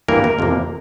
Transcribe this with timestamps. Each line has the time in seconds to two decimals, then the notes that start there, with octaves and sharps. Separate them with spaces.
0.08 G2 E3 A#3 A#4
0.24 A#4
0.39 F2 C3 E3 A#3